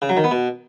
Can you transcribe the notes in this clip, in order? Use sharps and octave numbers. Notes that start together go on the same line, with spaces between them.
C#3
F#3
D#3
B3
B2